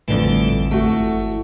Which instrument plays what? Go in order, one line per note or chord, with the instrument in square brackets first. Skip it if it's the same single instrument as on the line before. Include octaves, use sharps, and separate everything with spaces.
[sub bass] A1 [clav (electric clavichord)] F2 D3 E3 [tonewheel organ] A2 G3 A3
[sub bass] G1 [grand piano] A3 F#4 [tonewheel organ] E4